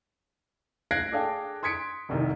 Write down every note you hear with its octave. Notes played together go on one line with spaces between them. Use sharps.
F5 F#6 G#6 A#6 C7 D7
D4 G#4 A4 F5 G5
C6 D#6 G#6 B6 C#7 D7
F1 C2 D#3